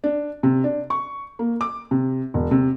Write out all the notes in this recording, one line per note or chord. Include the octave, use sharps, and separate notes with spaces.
D4
C3
D4
C#6
A#3
D6
C3
E1
C3